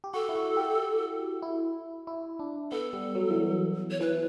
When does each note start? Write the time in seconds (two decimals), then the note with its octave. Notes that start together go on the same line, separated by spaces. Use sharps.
0.04 G4
0.14 F#4 A4
0.29 E4
0.35 F#4
0.57 G4
1.42 E4
2.07 E4
2.39 D4
2.72 B3 A4
2.93 G3
3.15 F#3
3.30 E3
3.36 F#3
3.91 C#5
4.01 E3 B4